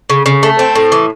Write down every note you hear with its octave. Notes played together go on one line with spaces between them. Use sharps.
C#3
C#3
A3
C4
A2
E3